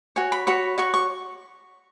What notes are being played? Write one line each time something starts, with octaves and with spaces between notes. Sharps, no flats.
F#4 C#5 G#5
B5
F#4 C#5 B5
F#4 C#5 C#6
C#6